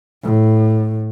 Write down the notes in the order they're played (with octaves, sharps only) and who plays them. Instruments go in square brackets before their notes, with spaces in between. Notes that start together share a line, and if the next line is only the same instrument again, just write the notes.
[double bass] A2